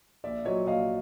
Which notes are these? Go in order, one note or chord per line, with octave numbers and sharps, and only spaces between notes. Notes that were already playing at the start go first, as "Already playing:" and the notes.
A#1 D5 E5
A#2 F#3 C#5 D#5
A#1 D#5 F5